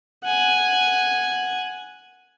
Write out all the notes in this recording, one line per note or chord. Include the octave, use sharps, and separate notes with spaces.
F#5 G#5